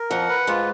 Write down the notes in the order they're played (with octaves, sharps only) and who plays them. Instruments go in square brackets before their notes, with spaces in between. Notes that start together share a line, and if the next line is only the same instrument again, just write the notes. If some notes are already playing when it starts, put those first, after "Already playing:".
Already playing: [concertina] A#4
[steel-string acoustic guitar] F2 F3 [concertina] F#5
[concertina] B4
[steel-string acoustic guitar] G#2 G#3 [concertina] F4